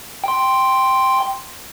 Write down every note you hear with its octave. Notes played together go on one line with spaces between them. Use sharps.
G5 C6